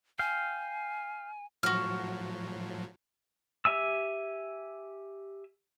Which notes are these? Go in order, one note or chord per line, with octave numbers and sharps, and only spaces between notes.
F5 G5 G#5
A2 F3 F#3 F#4 F6
G4 E5 G#5 E6